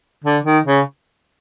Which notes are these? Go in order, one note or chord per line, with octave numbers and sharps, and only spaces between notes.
D3
D#3
C#3